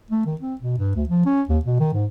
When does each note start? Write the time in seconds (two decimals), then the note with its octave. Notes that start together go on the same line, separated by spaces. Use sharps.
0.11 A3
0.26 D#3
0.41 C4
0.61 B2
0.78 G2
0.96 D2
1.09 F3
1.26 C#4
1.49 D#2
1.65 B2
1.80 D#3
1.94 G#2